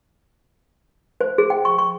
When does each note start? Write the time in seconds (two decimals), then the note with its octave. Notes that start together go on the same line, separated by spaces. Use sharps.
1.21 C5
1.38 G#4
1.50 G5
1.65 C#6
1.78 C#6